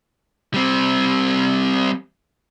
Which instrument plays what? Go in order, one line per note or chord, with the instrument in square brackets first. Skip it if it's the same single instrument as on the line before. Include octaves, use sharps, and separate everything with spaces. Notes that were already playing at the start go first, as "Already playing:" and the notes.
[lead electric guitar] G3 C4